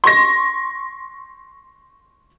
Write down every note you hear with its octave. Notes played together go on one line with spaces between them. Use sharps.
C6 C#6 A#6